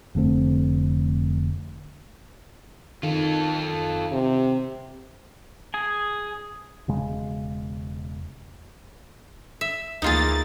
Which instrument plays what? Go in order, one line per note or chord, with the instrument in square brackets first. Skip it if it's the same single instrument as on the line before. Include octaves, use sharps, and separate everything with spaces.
[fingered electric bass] F1 D3 A3 C4
[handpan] D#3 [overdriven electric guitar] F4 A4
[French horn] C3
[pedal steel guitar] G#4 G#5
[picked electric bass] E1 C#3 G#3
[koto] E5
[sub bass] D2 [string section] E3 A#3 A6 [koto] D#4 F4 G#4